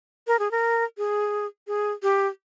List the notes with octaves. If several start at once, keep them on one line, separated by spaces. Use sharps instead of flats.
A#4
G#4
A#4
G#4
G#4
G4